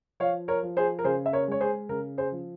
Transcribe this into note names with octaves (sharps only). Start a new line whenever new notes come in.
F3 C#5 F5
A#4 C#5
F3
G#4 C5
A#4
C#3 G#4 C5
E5
A#4 C#5
G#3 C#5
G#4 C5
C#3 A#4
G#4 C5
F3